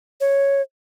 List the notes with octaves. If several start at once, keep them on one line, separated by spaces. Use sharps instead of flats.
C#5